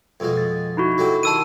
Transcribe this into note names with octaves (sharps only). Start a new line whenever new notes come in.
F2 B2 G#3
A6
D#4 E4 F#4
F#3 A3 G4
D#3 A5 C6 E6 D#7